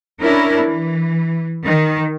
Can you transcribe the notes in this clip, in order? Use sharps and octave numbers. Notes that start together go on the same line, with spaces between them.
C#4 D4 E4 A#4
E3
D#3